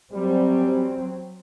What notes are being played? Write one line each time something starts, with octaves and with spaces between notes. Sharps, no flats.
F#2 F#3 G3 C4